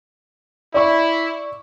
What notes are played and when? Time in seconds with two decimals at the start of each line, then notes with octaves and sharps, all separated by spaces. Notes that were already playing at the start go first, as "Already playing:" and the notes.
0.74 E4 D5 C#6